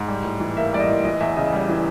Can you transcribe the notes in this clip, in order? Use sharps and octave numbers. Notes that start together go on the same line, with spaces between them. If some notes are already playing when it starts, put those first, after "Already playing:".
Already playing: G#2
G3
A2
E3
A#3 E5
G3 D5
D#5
A2
E3 D#5
E2 E5
C#3 D#5
G3
E3